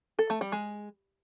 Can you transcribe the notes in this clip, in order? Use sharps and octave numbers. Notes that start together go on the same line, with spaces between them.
A4
A3
G3
G#3